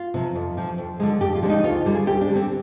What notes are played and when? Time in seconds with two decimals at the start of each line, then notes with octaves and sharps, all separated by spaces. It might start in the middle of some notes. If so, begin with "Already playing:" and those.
Already playing: F4
0.14 C3 F3
0.35 F2
0.57 C3 F3
0.78 F2
1.00 D3 F3 G#3
1.20 F2 G4
1.35 F4
1.42 D3 F3 G#3 D4
1.49 D#4
1.64 D2 F4
1.85 D3 G3
1.95 G#4
2.06 D2 G4
2.21 D4
2.28 D3 G3
2.36 C4